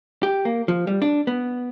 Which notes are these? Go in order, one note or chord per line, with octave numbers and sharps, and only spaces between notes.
G4
A#3
F3
G3
D4
B3